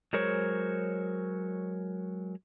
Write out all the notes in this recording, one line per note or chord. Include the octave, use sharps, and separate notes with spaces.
F#3 G#3 G#4 A#4 C5 C#5